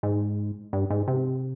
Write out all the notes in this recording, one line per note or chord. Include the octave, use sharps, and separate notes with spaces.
G#2
G2
G#2
C3